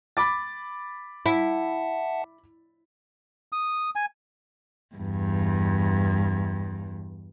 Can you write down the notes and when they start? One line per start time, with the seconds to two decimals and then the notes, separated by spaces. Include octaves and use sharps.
0.17 B5 D6 A6
1.26 E4 E5 F#5 A5
3.52 D#6
3.96 G#5
4.96 E2 G2